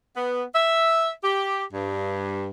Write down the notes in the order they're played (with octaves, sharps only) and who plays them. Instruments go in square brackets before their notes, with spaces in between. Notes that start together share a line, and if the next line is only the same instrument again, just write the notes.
[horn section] B3
E5
G4
G2